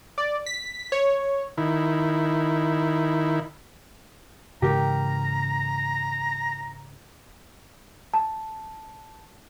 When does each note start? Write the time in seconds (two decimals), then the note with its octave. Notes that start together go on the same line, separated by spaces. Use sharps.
0.18 D5
0.46 B6
0.92 C#5
1.58 D#3 E4
4.62 G#2 C#3 E3 G4 A#4 G5 A#5
8.14 A5